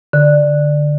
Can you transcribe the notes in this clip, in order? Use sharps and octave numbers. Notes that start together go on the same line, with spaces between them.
D3